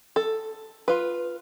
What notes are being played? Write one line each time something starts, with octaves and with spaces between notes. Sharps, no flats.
A4
F4 B4